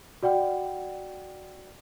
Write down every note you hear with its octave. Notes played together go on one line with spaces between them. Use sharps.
F#4 D5 F#5 G5